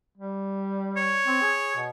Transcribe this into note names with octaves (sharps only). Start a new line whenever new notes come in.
G3
C#5
C4
G#4
B2